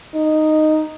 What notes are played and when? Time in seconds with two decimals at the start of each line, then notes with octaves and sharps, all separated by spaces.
0.15 D#4